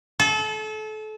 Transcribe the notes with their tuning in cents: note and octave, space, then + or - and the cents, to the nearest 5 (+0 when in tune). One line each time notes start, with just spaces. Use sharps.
A4 -30